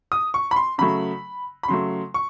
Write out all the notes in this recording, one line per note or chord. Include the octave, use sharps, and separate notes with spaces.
D#6
C#6
B5
C6
C#3 F#3 A3 B5
B5
C#3 F#3 A3 C6
C#6